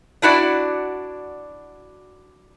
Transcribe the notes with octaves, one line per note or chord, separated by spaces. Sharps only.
D4 E4 F#4 D5